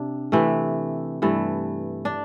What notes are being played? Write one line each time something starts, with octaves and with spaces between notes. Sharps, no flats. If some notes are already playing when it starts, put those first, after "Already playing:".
Already playing: C3 D4
C3 E3 A3
G2 E3 A3
D4